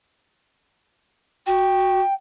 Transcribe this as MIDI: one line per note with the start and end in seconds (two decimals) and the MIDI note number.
1.47 2.01 66
1.47 2.14 79